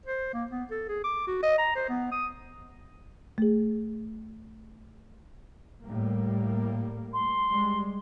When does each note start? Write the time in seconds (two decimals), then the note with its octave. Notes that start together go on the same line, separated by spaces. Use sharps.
0.06 C5
0.33 A#3
0.51 B3
0.71 A4
0.89 G#4
1.04 D6
1.27 F#4
1.43 D#5
1.58 A#5
1.76 C5
1.89 B3
2.12 D#6
3.38 A3 G#4
5.83 A2 G3 A#3
7.13 C6
7.52 G3 G#3